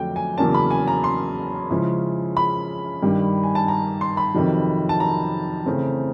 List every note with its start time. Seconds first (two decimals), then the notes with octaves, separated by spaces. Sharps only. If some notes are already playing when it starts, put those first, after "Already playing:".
Already playing: F2 D3 F#3 A3 D4 G5
0.16 G#5
0.38 E2 C#3 F#3 A#3 C#4 A5
0.54 B5
0.71 G#5
0.88 A#5
1.04 C6
1.70 C#3 F3 G#3 C#4 E4
2.37 B5
3.02 G2 D#3 G3
3.43 G#5
3.55 A5
3.68 A#5
4.01 C6
4.17 B5
4.34 F2 C3 D#3 F#3
4.89 A5
5.00 A#5
5.66 C#3 E3 A3 C4